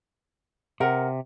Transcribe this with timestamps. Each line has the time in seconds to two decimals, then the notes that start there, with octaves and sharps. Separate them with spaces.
0.80 C3 A#4 F#5